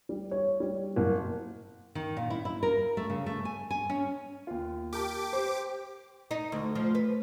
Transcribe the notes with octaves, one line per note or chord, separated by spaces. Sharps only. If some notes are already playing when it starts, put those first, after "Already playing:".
G3
C#5
G3
F#1
D#3
A#2
E4
E4
A#4
A3
C#3
A3
G#5
G#5
C#4
D#2 F4
G4 A#4 A5 D6
C5
D#4
D2
F3
B4